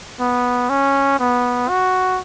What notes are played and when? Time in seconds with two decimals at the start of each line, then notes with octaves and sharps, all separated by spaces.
0.20 B3
0.69 C#4
1.19 B3
1.68 F#4